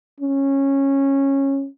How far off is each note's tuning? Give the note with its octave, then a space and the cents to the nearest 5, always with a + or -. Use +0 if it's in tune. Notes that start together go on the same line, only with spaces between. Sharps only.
C#4 -15